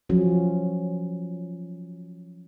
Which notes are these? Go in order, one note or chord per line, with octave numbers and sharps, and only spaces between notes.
F3 F#3 C#4